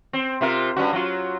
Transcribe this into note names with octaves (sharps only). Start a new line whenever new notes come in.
C4
C3 F4 A#4
G2 C#4 F#4
F#3 F4